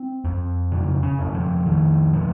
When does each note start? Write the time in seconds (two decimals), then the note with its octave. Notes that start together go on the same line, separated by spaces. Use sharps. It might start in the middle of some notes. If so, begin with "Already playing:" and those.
Already playing: C4
0.25 F2
0.72 C#3
1.03 C#4
1.19 F2
1.35 F3
1.66 F2 D#3
2.13 C#3 F3